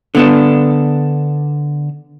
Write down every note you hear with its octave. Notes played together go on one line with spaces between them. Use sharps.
D3 B3 D4